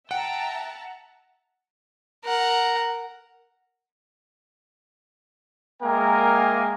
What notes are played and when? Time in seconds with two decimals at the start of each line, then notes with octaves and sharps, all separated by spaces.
0.11 E5 F#5 G5 A5 A#5
2.25 A#4 F#5
5.83 G#3 A#3 A#4 E5 G5 G#5